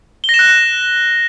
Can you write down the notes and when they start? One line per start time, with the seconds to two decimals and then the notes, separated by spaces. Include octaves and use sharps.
0.24 G7
0.29 A#6
0.34 E7
0.39 F#6